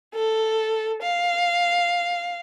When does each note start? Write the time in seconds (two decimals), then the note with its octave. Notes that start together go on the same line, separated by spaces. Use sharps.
0.14 A4
1.02 F5